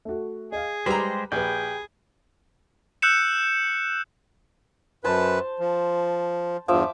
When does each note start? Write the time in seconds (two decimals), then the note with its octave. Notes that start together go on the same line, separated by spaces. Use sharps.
0.05 A3 F#4
0.52 G#4 D#5 F5
0.86 G3 G#3 G4 B4 C5 A#5
1.32 A#1 G4 G#4 B4 G5
3.02 E6 F#6 G6 C#7 E7
5.04 F#2 B4 C5 A5
5.59 F3
6.68 E2 G2 F3 E5 D6